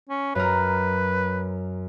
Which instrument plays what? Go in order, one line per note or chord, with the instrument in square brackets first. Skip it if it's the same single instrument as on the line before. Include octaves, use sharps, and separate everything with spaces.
[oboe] C#4
[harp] F#2 A#4 [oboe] B4